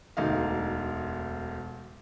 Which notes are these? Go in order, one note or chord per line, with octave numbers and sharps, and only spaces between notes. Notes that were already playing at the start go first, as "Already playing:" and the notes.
E1 D2 D#4 F5